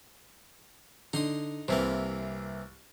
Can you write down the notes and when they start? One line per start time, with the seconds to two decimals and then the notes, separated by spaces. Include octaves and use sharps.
1.13 D3 D#4 C6 D#6
1.68 C2 C3 E3 A#3 C5